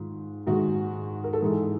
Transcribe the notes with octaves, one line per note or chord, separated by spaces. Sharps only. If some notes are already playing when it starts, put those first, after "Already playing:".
Already playing: G#2 D#3 G#3 F4
G#2 D#3 G#3 F#4
A#4
A4
G#2 E3 G#3 G#4